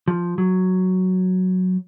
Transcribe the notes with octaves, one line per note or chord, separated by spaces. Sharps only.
F3
F#3